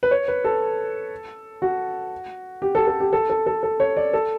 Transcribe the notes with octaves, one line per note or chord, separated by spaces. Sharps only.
B4
C#5
B4
A4
F#4
G4
A4
A4
G4
A4
A4
A4
A4
C#5
D5
A4